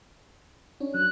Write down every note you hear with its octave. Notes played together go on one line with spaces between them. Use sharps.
C#4 D4 C#5
F#3 F#6